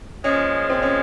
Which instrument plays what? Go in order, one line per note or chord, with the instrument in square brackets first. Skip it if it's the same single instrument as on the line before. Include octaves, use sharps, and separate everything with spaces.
[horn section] A#2 F3 G#3 [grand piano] C#4
[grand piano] C4
C#4